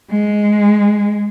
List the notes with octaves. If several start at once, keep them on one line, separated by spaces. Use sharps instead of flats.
G#3